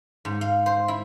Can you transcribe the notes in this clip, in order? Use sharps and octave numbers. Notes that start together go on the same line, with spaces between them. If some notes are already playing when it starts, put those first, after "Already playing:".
G#2
F5
C5
E4